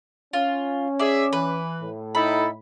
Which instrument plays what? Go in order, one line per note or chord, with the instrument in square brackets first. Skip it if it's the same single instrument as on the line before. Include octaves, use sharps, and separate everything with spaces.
[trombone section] C#4 [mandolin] F4
[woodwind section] G#4 E5 [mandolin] D5
[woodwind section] E3 [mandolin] B4
[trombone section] A2
[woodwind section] D#4 E4 A4 [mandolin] B5